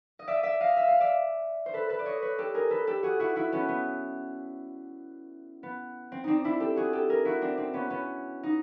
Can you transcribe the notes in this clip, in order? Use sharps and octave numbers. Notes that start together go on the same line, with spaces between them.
D#5
D5 E5
D5 E5
D#5 F5
E5
F5
D5 E5
C5
A4 B4
A4 B4
D5
C#5 D#5
B4 C#5
G4 A4
G#4 A#4
A4 B4
G4 A4
F#4 G#4
E4 F#4
E4 F#4
B3 C#4
B3
B3
C4
C4 D4 D#4
D4 E4
G4 A4
F#4 G#4
G4 A4
G#4 A#4
E4 F#4
C4 D4
C4 D4
B3 C#4
B3 C#4
D#4